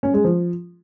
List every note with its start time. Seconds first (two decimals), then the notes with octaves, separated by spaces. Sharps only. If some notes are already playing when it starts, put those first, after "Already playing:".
0.03 C#4
0.14 G#3
0.24 F3